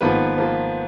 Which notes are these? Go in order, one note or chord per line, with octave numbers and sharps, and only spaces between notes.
G#1 G#2 F3 A#3 B3 B4
F3 A#3